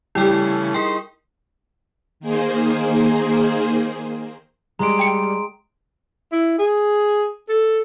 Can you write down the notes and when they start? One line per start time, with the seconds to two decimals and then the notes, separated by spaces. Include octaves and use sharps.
0.15 C#3 E3 G3 A3 E4 G4 G5
0.74 D#4 G#4 A#4 G5 C6
2.20 D#3 A#3 G#4 C5
4.79 G3 G#3 A#5 C6 C7 D7
4.99 G5 C#7
6.32 E4
6.58 G#4
7.49 A4